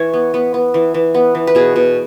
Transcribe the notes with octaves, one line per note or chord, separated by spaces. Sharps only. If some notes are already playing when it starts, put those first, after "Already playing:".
Already playing: E3 C#5
B3
B3
B3
E3
E3
B3
E3
B4
B2 G#4
B2